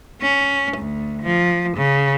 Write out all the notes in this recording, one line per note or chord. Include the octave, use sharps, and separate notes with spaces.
C#4
D2
F3
C#3